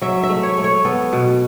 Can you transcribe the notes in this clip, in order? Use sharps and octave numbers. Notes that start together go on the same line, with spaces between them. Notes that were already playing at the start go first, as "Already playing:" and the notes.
F#3 E5
E5
A3
C#5
A3
C#5
B3 A4
B2